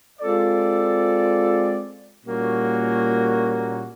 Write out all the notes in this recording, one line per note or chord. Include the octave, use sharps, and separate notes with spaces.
G#3 C4 F4 A4 D5
A#2 G3 A#3 C#4 F#4